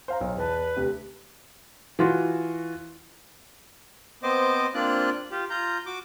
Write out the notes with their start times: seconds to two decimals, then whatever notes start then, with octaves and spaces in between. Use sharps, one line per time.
0.08 C5 F5 A#5
0.21 B1
0.37 E2 B4 A5
0.77 D2 C3
1.99 E3 F4 F#4
4.23 B3 C4 C5 D#5 D6
4.75 A#3 C4 D4 F4 D5 F#6
5.31 F4 G4
5.50 F4 A#5 G6
5.86 F#4 D6